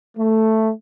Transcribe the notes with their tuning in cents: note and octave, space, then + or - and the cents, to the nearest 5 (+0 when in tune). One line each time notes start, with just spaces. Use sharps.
A3 +5